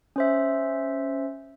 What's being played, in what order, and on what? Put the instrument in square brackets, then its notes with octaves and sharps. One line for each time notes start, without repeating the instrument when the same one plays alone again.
[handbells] C#4 C5 E5